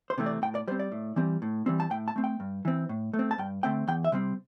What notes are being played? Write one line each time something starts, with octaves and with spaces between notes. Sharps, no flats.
C5
C3 E3 A3 C4
D5
A2 G5
D5
G3 C4 C5
D5
A2
E3 G3 C4
A2
E3 G3 C4
A5
A2 G5
A5
A3 C4
G5
G2
E3 C4
A2
A3
C4
A5
G2 G5
D3 A3 C4 G5
E2 G5
E5
C3 G3 C4